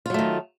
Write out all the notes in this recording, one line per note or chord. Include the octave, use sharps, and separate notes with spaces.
D#3 F#3 A3 F4